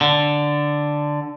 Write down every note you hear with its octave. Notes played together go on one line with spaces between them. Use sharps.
D3